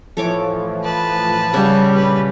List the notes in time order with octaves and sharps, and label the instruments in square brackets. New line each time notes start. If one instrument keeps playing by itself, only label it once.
[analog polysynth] A2 E3 F3 [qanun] A4 C#5 D6
[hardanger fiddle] B4 A5
[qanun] C#3 F#5 [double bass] G3
[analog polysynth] A#1 [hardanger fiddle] B4